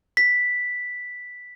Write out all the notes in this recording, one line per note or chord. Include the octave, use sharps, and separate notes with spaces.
B6